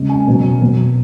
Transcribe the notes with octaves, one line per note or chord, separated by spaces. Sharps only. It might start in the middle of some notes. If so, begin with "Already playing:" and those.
Already playing: C#3 G#3
G#5
B2 F#3
B2 F#3